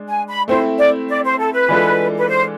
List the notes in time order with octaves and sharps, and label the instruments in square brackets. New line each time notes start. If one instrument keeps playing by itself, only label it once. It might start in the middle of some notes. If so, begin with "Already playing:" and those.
Already playing: [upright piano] G#3 D4
[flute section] G#5
B5
[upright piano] A3 C4 E4 [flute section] C5
[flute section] D5
D5
C5
A4
B4
[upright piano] E3 G#3 D4 F4 A4
[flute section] B4
C5